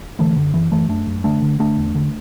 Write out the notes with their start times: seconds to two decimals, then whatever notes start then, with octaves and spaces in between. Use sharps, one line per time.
0.19 D3 E3 A3
0.36 F#2 D3
0.54 F#2 E3
0.71 F#2 E3 A3
0.88 F#2 A3 D4
1.07 F#2
1.24 D3 A3 D4
1.42 D3
1.59 D3 A3 D4
1.77 E2
1.95 D3